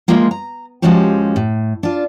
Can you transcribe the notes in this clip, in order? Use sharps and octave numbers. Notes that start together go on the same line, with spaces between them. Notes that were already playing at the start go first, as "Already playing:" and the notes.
E3 F3 G#3 A#3 F4
A#5
D#2 F3 G#3 C#4 F#4 G4
A2
D4 F4